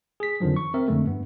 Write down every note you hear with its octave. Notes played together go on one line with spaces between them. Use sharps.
G#4 B6
F2 D3 D#3 F3 F#3
C#6
C4 A#4 E5
F2 D3 G#3 A3
G2 B3